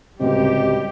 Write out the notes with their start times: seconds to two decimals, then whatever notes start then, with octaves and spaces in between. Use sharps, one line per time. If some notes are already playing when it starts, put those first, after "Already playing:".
0.20 D1 C#2 C3 G3 G4 D#5